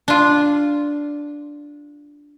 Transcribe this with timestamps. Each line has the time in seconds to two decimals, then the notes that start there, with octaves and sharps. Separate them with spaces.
0.08 D4 F4